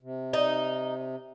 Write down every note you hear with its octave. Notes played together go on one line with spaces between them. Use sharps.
C3
D#4